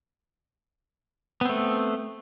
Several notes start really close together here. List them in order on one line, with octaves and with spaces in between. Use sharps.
B3 C4 A3